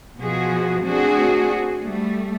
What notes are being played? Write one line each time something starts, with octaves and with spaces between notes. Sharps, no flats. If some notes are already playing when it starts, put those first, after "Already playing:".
B2 F3 F#4 G#4
A3 C4 D4 F#4 G#4
G3 A3